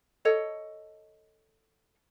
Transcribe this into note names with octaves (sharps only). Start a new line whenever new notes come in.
A4 C#5 D#5